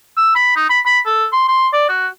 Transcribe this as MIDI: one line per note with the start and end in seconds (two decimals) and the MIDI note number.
0.17 0.32 88
0.36 0.52 83
0.56 0.67 63
0.70 0.80 83
0.86 1.00 83
1.06 1.26 69
1.32 1.47 84
1.48 1.68 84
1.73 1.85 74
1.89 2.07 66